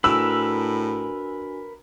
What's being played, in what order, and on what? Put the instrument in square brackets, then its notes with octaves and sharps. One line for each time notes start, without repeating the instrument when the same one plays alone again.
[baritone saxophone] A2 [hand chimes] D4 F#4 G#5 [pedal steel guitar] A#4 B4 [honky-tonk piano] E6